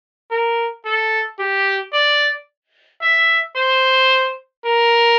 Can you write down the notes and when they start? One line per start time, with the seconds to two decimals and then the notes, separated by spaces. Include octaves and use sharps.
0.31 A#4
0.85 A4
1.39 G4
1.93 D5
3.02 E5
3.56 C5
4.65 A#4